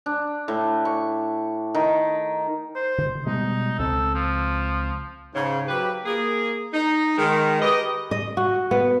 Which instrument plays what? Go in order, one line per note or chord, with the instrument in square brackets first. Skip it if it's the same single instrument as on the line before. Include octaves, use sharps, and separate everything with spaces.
[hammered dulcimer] D4
A2
C#6
D#3
[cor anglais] C5
[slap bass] D3
[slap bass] B2 G3 G#3 [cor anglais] D#4
[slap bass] C#2 C4 [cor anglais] A4
[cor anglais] F3
[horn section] G#2 C#3
F#3 G4 B4
A#3 G#4
D#4
D#3 G#3
G4 B4 D#5
[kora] D#5
F#4
B3